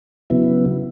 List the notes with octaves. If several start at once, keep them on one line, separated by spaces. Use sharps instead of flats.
C#3 F#3 B3 E4